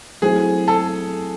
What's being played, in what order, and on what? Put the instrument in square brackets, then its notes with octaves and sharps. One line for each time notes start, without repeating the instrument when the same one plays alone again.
[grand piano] F#3 A3 C4 E4 [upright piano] G#4
[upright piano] A4